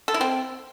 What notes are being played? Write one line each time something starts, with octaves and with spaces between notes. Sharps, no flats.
A4
E4
C4